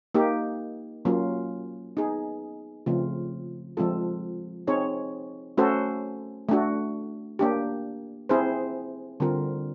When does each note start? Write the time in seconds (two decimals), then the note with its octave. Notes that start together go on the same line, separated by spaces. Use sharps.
0.14 A#3 D#4 G4
1.05 F#3 A#3 C#4 F4
1.97 B3 D#4 G#4
2.86 C#3 F3 A3 C4 F4
3.77 F3 G#3 C4 F4 A4
4.67 C4 D#4 G#4 C#5
5.57 A3 C#4 F#4 A4 C5
6.49 A3 D4 F#4
7.39 A#3 D4 G4
8.29 C4 E4 G#4 C5
9.20 D3 G3 C4 F4 A#4